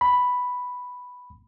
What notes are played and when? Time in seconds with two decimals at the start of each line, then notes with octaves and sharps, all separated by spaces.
0.01 B5